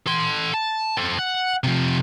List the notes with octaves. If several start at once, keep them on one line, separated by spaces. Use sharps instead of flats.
A4 C6
A5
C4 A4
F#5
C3 F3